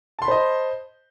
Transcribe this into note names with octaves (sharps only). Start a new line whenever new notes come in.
C5 D#5 A5 B5 C6